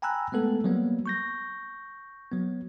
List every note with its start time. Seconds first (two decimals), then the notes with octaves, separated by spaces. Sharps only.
0.02 G5 G#5 A#5 B5 E6 F#6
0.32 G#3 A3 B3 A4
0.64 F#3 G3 A#3 B3
1.06 C#6 G6 A#6
2.31 F#3 B3